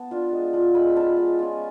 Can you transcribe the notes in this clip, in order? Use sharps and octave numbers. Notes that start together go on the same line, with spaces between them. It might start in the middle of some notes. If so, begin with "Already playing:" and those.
Already playing: B3 A5
D4 F4
G#3
D4 F4
G#3 B5
C#4 F4 A5
G#3
C#4 F4